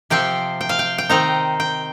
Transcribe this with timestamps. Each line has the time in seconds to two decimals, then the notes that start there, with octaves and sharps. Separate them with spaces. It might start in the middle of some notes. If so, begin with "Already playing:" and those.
0.10 C3 F3 C4 G5
0.61 G5
0.69 F5
0.79 G5
0.98 G5
1.09 D#3 C4 D#4 A#5
1.60 G5